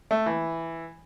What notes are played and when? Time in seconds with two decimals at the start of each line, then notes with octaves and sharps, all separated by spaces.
0.11 A3
0.26 E3